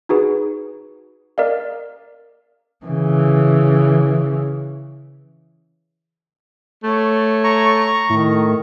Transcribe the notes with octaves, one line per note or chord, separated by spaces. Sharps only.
D#4 F#4 G#4 B4
A#4 D5 D#5 F5
C#3 E3
A3 C#5
A#5 C#6
A2 D#3